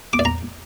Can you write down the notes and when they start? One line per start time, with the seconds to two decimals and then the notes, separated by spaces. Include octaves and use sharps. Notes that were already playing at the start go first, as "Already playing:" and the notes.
0.13 D6
0.19 D5
0.25 A#5